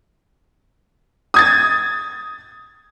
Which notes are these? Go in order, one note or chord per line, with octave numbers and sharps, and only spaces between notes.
D#6 G#6 A6